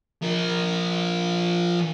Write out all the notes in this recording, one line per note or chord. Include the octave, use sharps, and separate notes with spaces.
F3 A#4